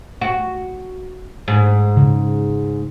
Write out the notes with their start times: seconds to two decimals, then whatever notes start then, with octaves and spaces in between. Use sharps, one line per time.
0.21 F#4
1.48 G#2
1.97 C#3